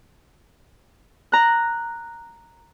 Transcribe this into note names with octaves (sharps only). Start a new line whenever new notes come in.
A#5 F#6